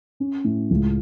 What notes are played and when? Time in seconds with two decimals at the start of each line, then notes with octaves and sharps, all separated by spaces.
0.20 C#4
0.44 A2
0.71 C#2